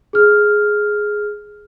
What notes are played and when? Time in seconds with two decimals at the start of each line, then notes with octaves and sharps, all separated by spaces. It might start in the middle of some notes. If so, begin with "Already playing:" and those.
0.13 G#4 F6